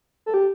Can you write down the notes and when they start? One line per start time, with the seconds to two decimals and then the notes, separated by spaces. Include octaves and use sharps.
0.26 A4
0.34 G4